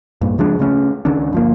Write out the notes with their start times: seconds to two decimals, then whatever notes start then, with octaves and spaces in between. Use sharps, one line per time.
0.21 G2 A#2
0.38 C#2 F3 G#3 D4
0.59 C#3 A3 A#3 C#4
1.05 C#2 D#3 C#4 D4
1.33 G1 F3 A#3